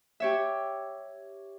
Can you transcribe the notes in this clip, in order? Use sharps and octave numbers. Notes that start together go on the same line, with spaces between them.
G4 C#5 E5